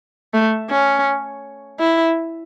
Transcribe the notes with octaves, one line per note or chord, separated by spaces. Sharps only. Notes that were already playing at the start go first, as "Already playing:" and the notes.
A3
C#4
E4